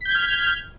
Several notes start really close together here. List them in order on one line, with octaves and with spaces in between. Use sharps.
B6 G6 G#6 F6